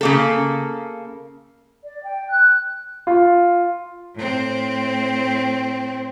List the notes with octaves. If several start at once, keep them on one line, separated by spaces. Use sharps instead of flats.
C#3 A#3 A4
D5
G5
F#6
F4
A2 C4